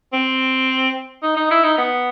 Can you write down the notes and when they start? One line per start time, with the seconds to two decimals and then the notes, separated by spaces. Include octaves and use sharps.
0.13 C4
1.23 D#4
1.36 D#4
1.51 E4
1.64 D#4
1.78 B3